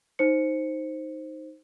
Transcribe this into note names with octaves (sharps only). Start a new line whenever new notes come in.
D#4 C5 C#7